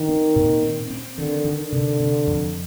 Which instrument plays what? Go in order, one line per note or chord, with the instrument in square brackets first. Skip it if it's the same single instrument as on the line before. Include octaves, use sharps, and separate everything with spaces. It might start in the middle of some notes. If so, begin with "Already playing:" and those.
Already playing: [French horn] D#3
[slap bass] C4
A#2
C4
C4
[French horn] D3 [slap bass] D#3
[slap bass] D#3
[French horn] D3
[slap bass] C3
C3
F2